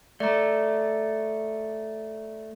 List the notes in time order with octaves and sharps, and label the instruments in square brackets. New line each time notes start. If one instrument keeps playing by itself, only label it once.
[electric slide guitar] A3 [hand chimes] D5 A#5